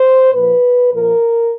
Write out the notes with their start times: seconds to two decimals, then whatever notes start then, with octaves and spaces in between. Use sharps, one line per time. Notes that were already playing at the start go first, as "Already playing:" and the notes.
Already playing: C5
0.33 A#2 F3 B4
0.92 A#2 F3 A#4